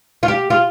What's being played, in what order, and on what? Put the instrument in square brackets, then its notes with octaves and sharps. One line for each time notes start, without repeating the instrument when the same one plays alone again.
[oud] F4
G4
F4